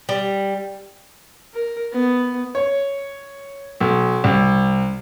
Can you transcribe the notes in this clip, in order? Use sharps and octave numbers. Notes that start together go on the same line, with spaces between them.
G3
A#4
B3
C#5
B1
C2